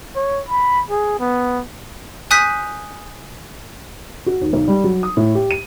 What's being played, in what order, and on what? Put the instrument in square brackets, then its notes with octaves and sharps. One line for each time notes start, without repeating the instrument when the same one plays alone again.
[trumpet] C#5
B5
G#4
B3
[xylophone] G#5 D#6 F#6 G6 B6
[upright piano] F#4
D#2
B1
G3
F#3
D#6
A2
G4
D#7